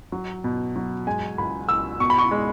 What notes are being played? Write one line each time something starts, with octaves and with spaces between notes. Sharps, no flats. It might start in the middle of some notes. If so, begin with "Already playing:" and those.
F#3
B2
F#3
G#3 G#5
C#2 B5
C#2 E6
B2 C#6
B5
C#6
G#3